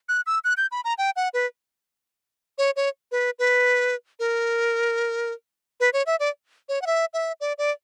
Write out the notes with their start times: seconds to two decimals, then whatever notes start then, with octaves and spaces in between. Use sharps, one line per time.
0.09 F#6
0.26 E6
0.44 F#6
0.57 G6
0.71 B5
0.84 A#5
0.98 G5
1.16 F#5
1.34 B4
2.58 C#5
2.76 C#5
3.12 B4
3.39 B4
4.19 A#4
5.80 B4
5.93 C#5
6.06 E5
6.20 D5
6.69 C#5
6.82 F#5
6.87 E5
7.14 E5
7.41 D5
7.58 D5